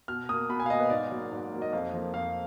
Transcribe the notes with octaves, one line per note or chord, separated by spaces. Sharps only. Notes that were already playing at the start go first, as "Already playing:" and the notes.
B2 F6
A#3 D#6
B2 B5
G#5
F5
A#3 D#5
B4
G#2 D5
F#3 A#3
G#2
F#3 A#3
D#5
F2 F5
F3 A#3
F2 F5